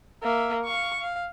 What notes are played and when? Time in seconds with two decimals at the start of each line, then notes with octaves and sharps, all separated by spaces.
0.23 A#3 E5
0.64 F5 C#6
1.00 F5